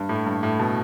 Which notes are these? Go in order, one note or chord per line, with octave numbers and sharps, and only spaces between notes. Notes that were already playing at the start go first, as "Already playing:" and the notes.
Already playing: G2
A2
G2
A2
B2